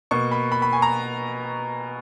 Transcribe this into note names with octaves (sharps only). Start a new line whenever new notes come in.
B2 A#3 C#6
B5
B5
B5
G#5
A#5